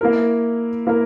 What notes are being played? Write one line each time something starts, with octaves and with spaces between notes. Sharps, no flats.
A#3 E4 A#4
A#3 E4 A#4